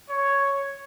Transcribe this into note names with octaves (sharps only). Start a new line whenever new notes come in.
C#5